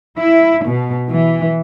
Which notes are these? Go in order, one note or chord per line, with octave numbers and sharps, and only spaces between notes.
E4
B2
E3